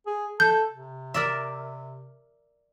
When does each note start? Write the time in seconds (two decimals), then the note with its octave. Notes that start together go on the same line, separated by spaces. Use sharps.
0.07 G#4
0.40 A4 G6
0.71 C3
1.14 A#4 D5 E5